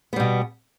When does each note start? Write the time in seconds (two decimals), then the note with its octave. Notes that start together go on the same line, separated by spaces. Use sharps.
0.13 B3
0.16 G3
0.20 B2